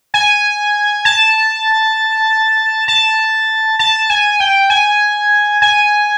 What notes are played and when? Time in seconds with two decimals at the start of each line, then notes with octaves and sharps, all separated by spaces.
0.14 G#5
1.05 A5
2.88 A5
3.79 A5
4.10 G#5
4.40 G5
4.70 G#5
5.62 G#5